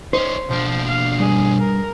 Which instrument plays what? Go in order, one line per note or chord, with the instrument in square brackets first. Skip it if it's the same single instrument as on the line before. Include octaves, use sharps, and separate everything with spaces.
[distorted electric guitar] C#4 D#4 [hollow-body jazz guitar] C5
[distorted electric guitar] B1 D4 [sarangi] F3
[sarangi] F5
[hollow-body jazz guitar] G2 [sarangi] G#4
[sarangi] A#4